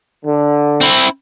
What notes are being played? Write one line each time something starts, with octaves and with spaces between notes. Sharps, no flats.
D3
C4 E4